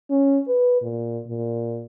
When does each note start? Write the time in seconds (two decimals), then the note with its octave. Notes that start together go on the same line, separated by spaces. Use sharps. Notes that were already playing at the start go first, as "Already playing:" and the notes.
0.11 C#4
0.48 B4
0.82 A#2
1.27 A#2